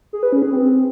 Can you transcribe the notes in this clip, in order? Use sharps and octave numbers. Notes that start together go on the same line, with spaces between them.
G#4
B4
C#4
G#4
C4